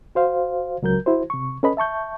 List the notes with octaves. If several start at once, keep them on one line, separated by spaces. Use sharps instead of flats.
F#4 C5 F5
C#2 F#3 A#4 G6
E4 F#4 C5
C3 C#6
C#4 A4 B4 D#5 B5
E5 A5 C#6 G6